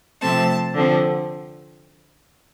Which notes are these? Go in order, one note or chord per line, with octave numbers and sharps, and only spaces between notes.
C3 F3 A3 C4 A5
D3 F3 C4